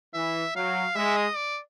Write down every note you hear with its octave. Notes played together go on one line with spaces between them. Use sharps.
E3 E5
F#3 F5
G#3 E5
D#5
D5